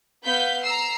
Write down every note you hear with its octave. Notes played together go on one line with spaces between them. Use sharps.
B3 F5 G6 B6
A#5 E6 C7